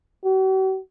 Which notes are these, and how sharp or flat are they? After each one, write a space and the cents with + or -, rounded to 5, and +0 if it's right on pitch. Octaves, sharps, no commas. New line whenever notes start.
F#4 +45